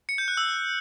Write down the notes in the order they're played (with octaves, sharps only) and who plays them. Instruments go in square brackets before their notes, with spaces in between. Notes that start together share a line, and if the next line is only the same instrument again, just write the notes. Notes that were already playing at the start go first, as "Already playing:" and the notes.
[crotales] C#7
G6
F#6
E6